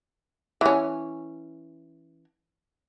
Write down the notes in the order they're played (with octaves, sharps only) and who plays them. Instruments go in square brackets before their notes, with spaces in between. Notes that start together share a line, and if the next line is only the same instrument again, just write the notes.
[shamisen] E3 C#4